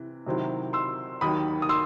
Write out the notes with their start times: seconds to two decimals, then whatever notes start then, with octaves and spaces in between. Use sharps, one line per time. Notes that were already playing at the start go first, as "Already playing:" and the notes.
Already playing: C3 E3
0.26 C3 D#3 F#3 C4 E4
0.73 C6 E6
1.21 D#2 D#3 F#3 B5 D#6
1.62 D#6
1.69 C6 E6